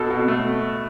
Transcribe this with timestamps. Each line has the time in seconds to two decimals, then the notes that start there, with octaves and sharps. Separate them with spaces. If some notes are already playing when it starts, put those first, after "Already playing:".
Already playing: B2 A4
0.10 B2
0.28 A3